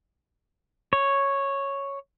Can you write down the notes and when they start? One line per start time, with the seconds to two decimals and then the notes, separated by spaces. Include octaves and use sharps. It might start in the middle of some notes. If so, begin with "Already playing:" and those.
0.93 C#5